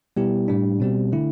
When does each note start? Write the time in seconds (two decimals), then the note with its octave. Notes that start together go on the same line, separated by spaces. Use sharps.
0.17 B2 G3 B3 E4 G4
0.48 A2 G3 D4
0.80 B2 G3 C4 G4
1.12 D3 A3 E4